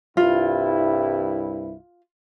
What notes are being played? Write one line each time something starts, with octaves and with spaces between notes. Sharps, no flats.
C2 G2 E4 F4